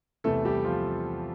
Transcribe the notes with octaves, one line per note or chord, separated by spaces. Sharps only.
E2 C3 E3 A3 A4
G3 G4
F3 F4